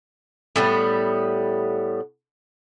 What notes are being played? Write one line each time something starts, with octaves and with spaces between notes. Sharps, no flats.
A2 G3 B3